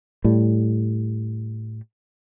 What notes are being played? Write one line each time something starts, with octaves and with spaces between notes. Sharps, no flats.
A2 G3